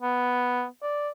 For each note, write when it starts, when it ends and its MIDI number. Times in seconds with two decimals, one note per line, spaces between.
0.02 0.66 59
0.83 1.09 74